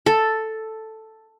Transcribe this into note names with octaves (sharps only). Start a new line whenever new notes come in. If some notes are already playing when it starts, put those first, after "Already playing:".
A4